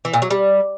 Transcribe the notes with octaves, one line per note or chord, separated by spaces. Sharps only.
E3
A#2
F#3
G3